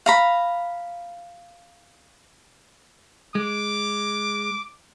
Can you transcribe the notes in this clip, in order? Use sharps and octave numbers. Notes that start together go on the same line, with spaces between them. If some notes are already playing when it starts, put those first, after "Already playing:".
F5 A#5 B5
G#3 D6